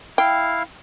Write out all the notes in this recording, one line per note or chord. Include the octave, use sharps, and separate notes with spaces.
E4 F5 G5